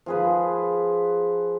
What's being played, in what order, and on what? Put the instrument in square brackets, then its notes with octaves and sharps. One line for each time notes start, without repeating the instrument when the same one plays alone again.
[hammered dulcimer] F3 G#4 B4